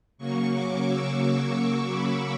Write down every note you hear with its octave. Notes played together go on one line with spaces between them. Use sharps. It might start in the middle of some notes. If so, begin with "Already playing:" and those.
C#3 F#3 A#3 C#6
D6
E6
C#6
C#6
B5